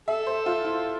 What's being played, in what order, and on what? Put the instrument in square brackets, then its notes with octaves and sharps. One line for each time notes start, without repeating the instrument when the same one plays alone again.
[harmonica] A4 [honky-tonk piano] E5
[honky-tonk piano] C5
F4
E4